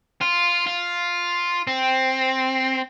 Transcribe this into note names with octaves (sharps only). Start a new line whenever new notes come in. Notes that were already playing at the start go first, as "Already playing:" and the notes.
F4
F4
C4